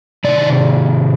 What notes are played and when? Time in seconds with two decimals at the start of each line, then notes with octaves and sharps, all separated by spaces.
0.24 C3 D#3 D5